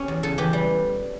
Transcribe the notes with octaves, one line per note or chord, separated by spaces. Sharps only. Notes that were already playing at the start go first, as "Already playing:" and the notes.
Already playing: C#4 G4
E2
C#3 A4
E3 G4
G3